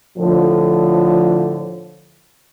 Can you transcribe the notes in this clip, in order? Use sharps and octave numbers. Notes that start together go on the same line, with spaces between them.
A2 D3 F3